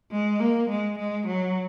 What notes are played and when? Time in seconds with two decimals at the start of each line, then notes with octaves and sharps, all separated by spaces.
0.12 G#3
0.40 A#3
0.70 G#3
0.99 G#3
1.27 F#3